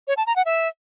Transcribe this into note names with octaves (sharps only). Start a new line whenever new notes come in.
C#5
A5
A#5
F#5
E5